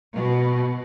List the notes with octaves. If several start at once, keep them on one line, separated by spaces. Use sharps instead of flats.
B2